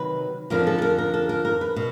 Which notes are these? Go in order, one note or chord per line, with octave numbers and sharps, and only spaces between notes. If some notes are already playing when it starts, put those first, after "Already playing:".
Already playing: C3 D#3 F#3 B4
F2 D3 F3 A#4
A4
A4
A#4
A#4
A4
A#4
A#4
B4
B2